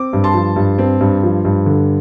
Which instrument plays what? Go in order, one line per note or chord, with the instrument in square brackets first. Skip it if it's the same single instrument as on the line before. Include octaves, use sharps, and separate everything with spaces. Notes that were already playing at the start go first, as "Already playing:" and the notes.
Already playing: [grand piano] C4 D6
G2
A5 C6
F3
G2
C4
G2
F3
G2
D3